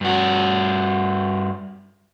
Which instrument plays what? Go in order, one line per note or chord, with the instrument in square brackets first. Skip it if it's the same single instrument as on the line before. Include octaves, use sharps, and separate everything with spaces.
[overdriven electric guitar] G2 F#4